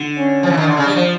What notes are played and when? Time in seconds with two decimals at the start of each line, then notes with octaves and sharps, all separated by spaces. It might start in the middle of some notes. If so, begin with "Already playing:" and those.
Already playing: D3
0.18 C#4
0.43 F3
0.50 E3
0.57 D#3 D4
0.67 D3
0.77 C#3
0.86 G3
0.96 F3